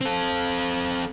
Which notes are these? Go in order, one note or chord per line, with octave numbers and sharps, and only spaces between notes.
C4 A4